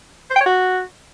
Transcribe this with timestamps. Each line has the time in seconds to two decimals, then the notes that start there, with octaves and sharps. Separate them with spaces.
0.30 C5
0.36 G5
0.41 C#5
0.46 F#4